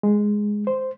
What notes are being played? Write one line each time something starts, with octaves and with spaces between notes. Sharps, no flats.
G#3
C5